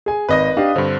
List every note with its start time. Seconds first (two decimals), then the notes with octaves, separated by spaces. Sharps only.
0.06 G#4 G#5
0.29 G#1 B4 D#5 D#6 A#6
0.57 D4 G4 F5
0.76 G2 D3 C4